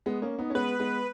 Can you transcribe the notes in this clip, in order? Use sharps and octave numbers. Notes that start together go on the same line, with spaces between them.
G#3 B3
A#3 C#4
B3 D#4
C#4
G#3 B3 B4
G#3 B3